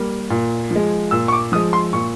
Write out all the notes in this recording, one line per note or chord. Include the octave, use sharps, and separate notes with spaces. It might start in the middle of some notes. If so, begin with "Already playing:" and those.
Already playing: G3 A#3
A#2
F3
G#3
A#2 E6
C#6
D6
F3 G#3 D#6
C6
A#2 C#6